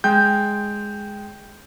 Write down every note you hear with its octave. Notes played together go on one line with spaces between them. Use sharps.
G#3 G5 G6